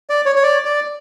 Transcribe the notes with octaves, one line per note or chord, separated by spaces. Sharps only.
D5
C#5
C#5
D5
D5